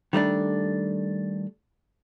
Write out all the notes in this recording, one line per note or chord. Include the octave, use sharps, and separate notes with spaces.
D#3 G3 A3 D4